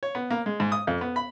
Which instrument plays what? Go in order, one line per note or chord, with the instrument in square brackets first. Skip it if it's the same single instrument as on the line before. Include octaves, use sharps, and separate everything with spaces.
[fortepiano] C#5
B3
A#3
G#3
G#2
D#6
F2
B3
B5